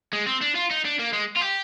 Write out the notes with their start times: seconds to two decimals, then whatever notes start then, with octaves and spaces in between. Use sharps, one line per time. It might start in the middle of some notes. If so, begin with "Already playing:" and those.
0.13 G#3
0.27 C4
0.42 D4
0.55 F4
0.71 D#4
0.85 D4
0.99 A#3
1.13 G#3
1.37 F4
1.41 G4